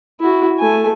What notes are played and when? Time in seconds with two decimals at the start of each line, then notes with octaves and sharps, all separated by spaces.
0.20 E4 F#4
0.59 A3 G#5